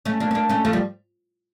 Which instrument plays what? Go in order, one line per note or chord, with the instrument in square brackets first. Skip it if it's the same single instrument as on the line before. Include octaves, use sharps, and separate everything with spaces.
[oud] A3 C#4
A#3 D4
C#4
A#3 D4
A3 C#4
F3 A3
G3